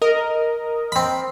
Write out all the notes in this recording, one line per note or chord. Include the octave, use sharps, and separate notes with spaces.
A#4 D#5
C4 B5